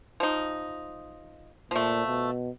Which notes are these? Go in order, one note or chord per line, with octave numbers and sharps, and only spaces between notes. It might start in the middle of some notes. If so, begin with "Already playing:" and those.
F3 D#4
A#2 F3 A3
B2